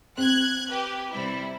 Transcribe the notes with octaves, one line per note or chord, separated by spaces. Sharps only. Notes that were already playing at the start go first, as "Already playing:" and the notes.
C4 F#6 G#6
G4 B4
C3 G3 E4